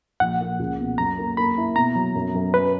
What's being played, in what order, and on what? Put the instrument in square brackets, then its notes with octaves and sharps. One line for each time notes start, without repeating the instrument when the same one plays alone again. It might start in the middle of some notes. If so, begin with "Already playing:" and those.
[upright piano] A#1 [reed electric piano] F#5
[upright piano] A#3
C#2
B2
[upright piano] F#2 [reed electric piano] A#5
[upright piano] A#3
[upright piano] A#3 [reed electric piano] B5
[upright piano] E4
[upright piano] B2 [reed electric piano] A#5
[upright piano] F#3
F#2
F#2
[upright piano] C#4 [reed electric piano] B4